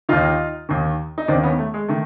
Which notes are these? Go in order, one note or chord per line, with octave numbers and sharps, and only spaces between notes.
D#2 D#3 D#4 F4
D#2 D#3
D#4
D#2 D#3 C4 D4
B3 C#4
A3
G#3
D#3 A3